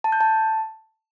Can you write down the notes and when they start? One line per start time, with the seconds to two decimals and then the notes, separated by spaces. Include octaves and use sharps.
0.04 A5
0.12 G6
0.21 A5